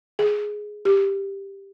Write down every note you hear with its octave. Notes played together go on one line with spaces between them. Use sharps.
G#4
G4